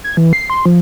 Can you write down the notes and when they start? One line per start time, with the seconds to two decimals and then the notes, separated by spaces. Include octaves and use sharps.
0.04 G#6
0.17 E3
0.33 C7
0.50 C6
0.66 F3